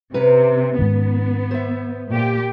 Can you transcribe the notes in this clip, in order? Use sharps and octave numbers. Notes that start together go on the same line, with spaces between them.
C3 C#4 B4 A#5
G#2 D#3 B3
C5 E5
A#2 G4